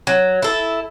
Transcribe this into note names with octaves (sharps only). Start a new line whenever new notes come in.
F#3
E4 A4